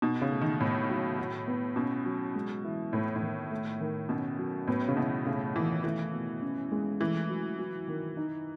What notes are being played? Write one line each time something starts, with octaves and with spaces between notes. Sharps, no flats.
B2 D#4
C#3
A3
D#3
A2 B3
F#3
F#4
B3
B2 C#4
F#3
G#3
E3
A2 A3
A2
D#3
A3
D#3
B2 C#4
F#3
A2 B3
C#3
B2 E3
C#3 A3
D#3 E3
E3 A3
B2
C#4
G#3
E3 A3
F#3
F#3
D#3
D#4